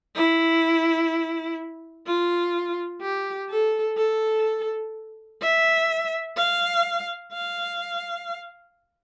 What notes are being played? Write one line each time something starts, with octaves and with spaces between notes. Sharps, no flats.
E4
F4
G4
A4
A4
E5
F5
F5